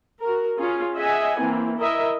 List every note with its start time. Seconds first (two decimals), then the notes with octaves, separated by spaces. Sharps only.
0.22 F#4 A#4
0.58 C#4 F4 G#4
0.95 G#4 D#5 E5 F#5 G#5
1.39 E3 A#3 C4
1.77 E4 A#4 D#5 E5